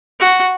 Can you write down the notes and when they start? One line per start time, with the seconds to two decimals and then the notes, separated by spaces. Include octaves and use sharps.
0.20 F#4